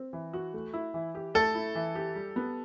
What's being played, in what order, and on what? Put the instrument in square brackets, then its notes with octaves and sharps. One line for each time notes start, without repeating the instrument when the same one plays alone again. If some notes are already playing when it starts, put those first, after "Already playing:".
Already playing: [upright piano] C4
E3
F#4
A3
E4
E3
G4
[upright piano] A3 [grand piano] A4
[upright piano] E4
E3
G4
G3
B3